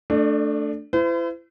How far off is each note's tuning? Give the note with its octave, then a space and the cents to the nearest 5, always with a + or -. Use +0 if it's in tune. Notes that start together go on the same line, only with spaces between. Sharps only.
A3 +0 D4 +0 D5 +40
E4 +35 C5 -45